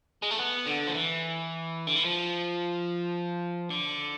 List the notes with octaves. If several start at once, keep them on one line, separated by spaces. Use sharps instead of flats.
G#3
A3
B3
D3
F3
E3
D3
E3
F3
D3